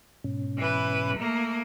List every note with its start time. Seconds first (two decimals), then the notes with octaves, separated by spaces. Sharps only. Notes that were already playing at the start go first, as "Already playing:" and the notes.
0.24 G#2 B2 C#4
0.58 E3 B4
1.16 A3 A#3 A#5